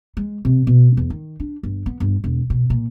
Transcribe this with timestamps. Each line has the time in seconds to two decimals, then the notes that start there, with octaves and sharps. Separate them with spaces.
0.17 G#3
0.45 C3
0.67 B2
0.97 E2
1.10 D#3
1.40 D4
1.63 G1
1.86 B3
2.00 G1
2.24 E1
2.50 B2
2.70 A#2